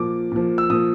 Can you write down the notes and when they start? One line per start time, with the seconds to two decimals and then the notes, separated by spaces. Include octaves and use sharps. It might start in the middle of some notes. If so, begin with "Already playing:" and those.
Already playing: A#2 F3 D6
0.32 A#2 F3
0.58 E6
0.70 A#2 F3 D#6